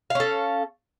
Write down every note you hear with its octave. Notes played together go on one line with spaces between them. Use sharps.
C#4 A4 F5